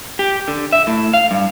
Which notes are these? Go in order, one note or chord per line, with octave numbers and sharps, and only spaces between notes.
G4
D3
E5
A2
F5
G2